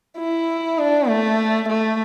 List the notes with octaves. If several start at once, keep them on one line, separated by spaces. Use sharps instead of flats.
E4
D4
A3
A3